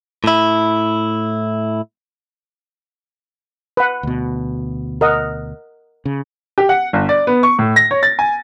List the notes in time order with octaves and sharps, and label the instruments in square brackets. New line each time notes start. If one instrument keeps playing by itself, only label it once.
[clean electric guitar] A2 E4
[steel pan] B4 F#5
[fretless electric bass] D2 B2
[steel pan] A#4 D#5 F#5
[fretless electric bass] C#3
[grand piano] G4
F#5
G1
D5
B3
C#6
A2
A#6
C#5
A6
G#5